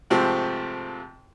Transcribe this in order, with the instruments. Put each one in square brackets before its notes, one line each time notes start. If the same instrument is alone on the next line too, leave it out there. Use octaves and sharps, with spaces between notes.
[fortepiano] G#2 C3 F3 A3 C4